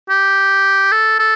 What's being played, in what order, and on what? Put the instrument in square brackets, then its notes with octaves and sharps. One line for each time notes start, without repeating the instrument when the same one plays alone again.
[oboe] G4
A4
A4